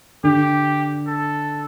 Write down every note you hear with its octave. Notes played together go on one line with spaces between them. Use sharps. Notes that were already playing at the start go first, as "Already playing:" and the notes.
D3 G4
A4